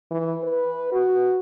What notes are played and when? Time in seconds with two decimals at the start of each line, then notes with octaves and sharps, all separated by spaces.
0.11 E3
0.44 B4
0.92 F#4